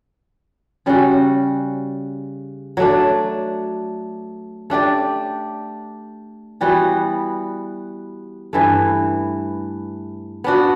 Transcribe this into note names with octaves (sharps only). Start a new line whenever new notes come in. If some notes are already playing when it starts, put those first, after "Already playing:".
C#3 G3 C#4 F#4
F#3 A3 D4
A3 D4 G4 D5
E3 G3 B3 F#4
G2 E3 A3
B3 D4 F#4